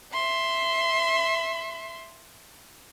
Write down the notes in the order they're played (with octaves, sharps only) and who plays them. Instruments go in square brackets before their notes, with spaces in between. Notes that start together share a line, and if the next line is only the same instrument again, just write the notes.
[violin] E5 C6